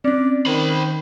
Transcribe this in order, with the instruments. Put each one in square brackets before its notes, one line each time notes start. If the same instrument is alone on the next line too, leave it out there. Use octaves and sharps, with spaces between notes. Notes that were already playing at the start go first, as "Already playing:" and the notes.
[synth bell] C4 C#4 [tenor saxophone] D5
[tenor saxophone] D#3 [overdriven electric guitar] C5 B5